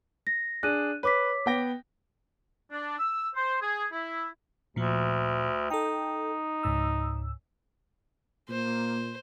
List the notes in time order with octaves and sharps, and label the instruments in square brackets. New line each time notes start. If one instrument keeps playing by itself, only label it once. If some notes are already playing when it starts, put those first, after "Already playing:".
[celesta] A#6
[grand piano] D4 G#4 [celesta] F#6 D#7
[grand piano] B4 [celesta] C#5 D6 B6
[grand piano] B3 G5 A#6
[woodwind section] D4
E6
C5
G#4
E4
[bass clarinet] D2 [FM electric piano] A#2 F3
[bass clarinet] D#4 [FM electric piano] A4 G5
[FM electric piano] C#2 G#2 E6
[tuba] A#2 [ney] A#3 [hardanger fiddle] C5